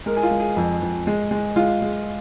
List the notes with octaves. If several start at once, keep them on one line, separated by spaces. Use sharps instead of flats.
G#3 A#4
G#4
F4
G#3
G#4
F2
F2
G#3
G#3
G#3 F4
G#3